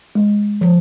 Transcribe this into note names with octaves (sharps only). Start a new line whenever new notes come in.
G#3
F3